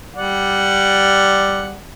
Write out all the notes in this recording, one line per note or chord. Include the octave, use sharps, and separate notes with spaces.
G3 D5 F#5